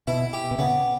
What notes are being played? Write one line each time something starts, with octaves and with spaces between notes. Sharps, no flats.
B2 E4
G4
B2
C#3 B3